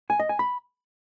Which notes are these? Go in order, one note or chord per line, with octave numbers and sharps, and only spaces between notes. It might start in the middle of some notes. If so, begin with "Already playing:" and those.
G#5
D#5
G#5
B5